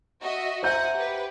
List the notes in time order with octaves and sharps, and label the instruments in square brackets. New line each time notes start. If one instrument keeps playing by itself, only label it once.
[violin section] F#4 D#5 E5
[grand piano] C5 E5 G6 [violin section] F#5 G#5 A#5
[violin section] G4 B4